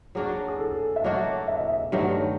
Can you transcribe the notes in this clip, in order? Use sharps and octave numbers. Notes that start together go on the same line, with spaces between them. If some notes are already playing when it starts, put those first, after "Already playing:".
F#3 A#3 D4 F#4 G#4
G#4
A4
E5
F#3 A#3 D4 F#4 D#5
E5
D#5
E5
G2 D#3 F#3 A3